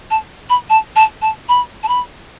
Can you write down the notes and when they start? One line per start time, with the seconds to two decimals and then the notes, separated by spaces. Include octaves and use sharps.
0.11 A5
0.50 B5
0.70 A5
0.96 A5
1.22 A5
1.49 B5
1.83 A5
1.88 B5